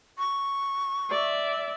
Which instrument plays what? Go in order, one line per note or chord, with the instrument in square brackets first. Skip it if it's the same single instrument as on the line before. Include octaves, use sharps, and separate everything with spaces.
[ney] C#6
[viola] D5 E5